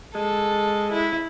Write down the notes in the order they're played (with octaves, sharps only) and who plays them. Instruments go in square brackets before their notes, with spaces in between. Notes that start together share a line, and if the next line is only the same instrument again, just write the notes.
[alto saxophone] G#3 [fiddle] A4
[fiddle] E4